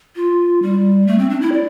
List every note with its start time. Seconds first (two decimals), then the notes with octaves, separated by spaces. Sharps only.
0.16 F4
0.62 G3
1.07 A3
1.18 C4
1.30 D4
1.41 E4
1.52 D5